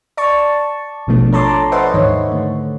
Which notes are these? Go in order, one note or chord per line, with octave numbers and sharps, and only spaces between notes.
D5 A5 C#6
A1 B2 F3 A3 D4
A4 C#5 A5 A#5 C6 D6
B4 C5 D#5 E5 F#5 C6
D#2 G#2 D#3 C#5
D3 A3